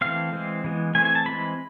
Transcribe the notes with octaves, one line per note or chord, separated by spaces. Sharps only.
E3 A3 C4 F5
E3 G#3 C4
E3 G#3 B3
E3 A3 C4 G#5
G#5
A5
E3 G#3 C4 B5